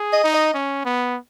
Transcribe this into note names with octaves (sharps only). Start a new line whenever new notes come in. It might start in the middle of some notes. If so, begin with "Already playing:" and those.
Already playing: G#4
D#5
D#4
D#5
C#4
B3